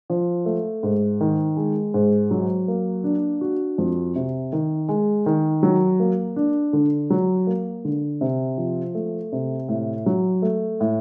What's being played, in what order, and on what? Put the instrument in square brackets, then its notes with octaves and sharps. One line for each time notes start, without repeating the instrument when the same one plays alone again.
[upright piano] F3
A3
G#2
D#3
G#3
G#2
F#3
A#3
D4
F#4
F2
C3
D#3
G#3
D#3
F#3
A#3
D4
D3
F#3
A#3
D3
C3
F3
A3
C3
A2
F#3
A3
A2